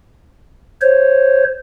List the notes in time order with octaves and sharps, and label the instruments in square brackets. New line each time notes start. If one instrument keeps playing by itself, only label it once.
[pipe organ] C5 C#5